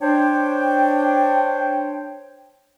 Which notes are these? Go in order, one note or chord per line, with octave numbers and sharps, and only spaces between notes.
D4 C5 C#5 G5